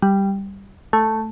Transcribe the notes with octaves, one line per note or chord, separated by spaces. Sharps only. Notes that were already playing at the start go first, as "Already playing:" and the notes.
G3
A3